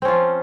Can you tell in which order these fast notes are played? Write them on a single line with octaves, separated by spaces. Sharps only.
C4 C#4 F4 F3